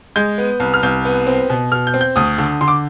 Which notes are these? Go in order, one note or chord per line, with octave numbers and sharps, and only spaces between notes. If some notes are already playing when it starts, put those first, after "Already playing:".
G#3 G6
B3
C2
F6
C2 G6
B3
C4
B2
B2 F6
G6
C4
G6
D2 D#6
D3
D3 C6
D6